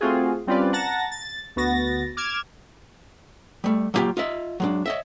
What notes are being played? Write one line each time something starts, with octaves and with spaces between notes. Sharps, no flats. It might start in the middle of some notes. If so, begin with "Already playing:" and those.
A3 C4 F4 F#4 G#4
G3 C4 C#4 F4 B4 D5
F#5 A5 A#5 A6 A#6
A6
D2 B3 F#4 A6 A#6
D6 F6 G#6 E7
G3 A3
F#3 G3 A#3 F4 G4
F4 D#5 E5
F#3 G#3 D4
C#5 D#5 E5